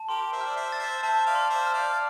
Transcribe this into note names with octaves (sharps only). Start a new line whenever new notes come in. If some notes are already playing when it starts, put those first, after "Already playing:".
Already playing: A5
G4 A#4 C6
C5 E5
F6
D5
C5 E5
A6
C5 E5
C5 E5 A5
D5 F5
C6
C5 E5
F6
D5 F5
D5